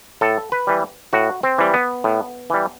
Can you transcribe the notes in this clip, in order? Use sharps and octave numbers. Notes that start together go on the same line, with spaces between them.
A2 A4
B4
E3 G3
A2 F#4
C4
E3 G3
B3
A2
E3 G3